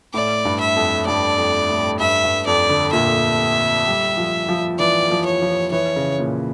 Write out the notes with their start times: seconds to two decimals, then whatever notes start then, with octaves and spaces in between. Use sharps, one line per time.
0.14 A2 D5
0.45 G2
0.61 E5
0.76 F2
1.07 G2 D5
1.38 F2
1.69 A2
2.00 G2 E5
2.24 G2
2.47 F2 D5
2.70 D3
2.93 A#2 E5
3.87 G3
4.17 F3
4.49 F3
4.79 E3 D5
5.10 F3
5.26 C#5
5.42 F3
5.72 E3 C#5
5.96 C#3
6.20 A#2